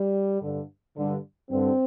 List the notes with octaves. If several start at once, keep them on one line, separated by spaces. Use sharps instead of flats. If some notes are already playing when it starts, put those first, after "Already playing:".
Already playing: G3
G2 D3
G2 D3
G2 D3 C4